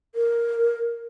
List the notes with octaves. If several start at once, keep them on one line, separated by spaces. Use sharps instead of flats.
A#4